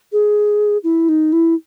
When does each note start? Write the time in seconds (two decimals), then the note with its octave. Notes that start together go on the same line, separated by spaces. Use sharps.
0.12 G#4
0.84 E4
1.09 D#4
1.33 E4